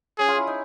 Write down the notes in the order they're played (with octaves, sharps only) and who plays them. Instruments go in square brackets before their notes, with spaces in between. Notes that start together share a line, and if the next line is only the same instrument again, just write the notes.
[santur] C#4 [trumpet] G#4
[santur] F4
E4
D#4